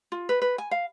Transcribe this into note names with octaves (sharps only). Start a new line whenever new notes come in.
F4
B4
B4
G#5
F5